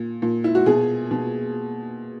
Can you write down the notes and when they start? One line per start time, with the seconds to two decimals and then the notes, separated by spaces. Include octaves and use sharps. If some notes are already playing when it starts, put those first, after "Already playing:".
Already playing: A#2
0.22 A#2
0.44 E4
0.55 F#4
0.66 B2 G#4
1.11 B2